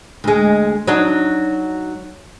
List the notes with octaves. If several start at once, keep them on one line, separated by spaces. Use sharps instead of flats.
D2 G#3
F#3 D4 D#4